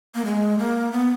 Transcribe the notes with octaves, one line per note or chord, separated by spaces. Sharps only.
A#3
G#3
A#3
B3